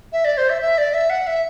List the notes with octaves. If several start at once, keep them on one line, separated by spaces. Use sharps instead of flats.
E5
D5
C5
E5
E5
D5
E5
F#5
E5